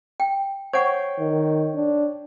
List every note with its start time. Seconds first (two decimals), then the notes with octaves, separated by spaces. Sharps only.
0.20 G5
0.73 C5 C#5 F#5 G5 C#6
1.19 D#3
1.75 D4